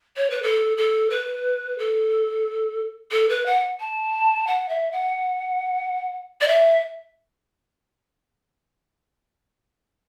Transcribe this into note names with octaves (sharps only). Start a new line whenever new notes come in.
C#5
B4
A4
A4
B4
A4
A4
B4
F#5
A5
F#5
E5
F#5
D5
E5